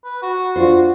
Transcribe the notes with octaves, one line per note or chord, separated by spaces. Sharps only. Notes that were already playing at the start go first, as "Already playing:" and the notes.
B4
F#4
D4 F4 C5